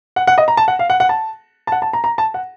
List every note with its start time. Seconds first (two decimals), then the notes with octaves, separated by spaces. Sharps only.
0.16 F#5
0.27 F#5
0.38 D#5
0.48 A#5
0.57 A5
0.68 F#5
0.79 F5
0.90 F#5
1.00 F#5
1.09 A5
1.67 A5
1.72 F#5
1.82 A5
1.93 A#5
2.04 A#5
2.18 A5
2.34 F#5